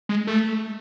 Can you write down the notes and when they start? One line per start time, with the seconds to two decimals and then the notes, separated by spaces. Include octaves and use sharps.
0.09 G#3
0.27 A3